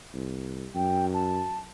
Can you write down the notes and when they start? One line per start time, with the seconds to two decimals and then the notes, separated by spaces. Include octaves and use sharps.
0.14 C2
0.75 F#2 G5
1.14 A5